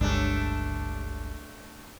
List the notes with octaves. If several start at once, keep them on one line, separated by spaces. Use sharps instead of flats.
G1 C#2 G2 G#3 A3 D4